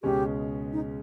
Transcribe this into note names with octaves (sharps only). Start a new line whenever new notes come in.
C#2 B2 G#3 C#4 G4
D#4